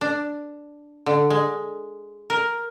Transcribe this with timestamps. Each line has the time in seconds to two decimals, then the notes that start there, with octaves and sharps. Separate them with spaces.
0.01 D4
1.06 D3
1.30 G#3
2.30 A#4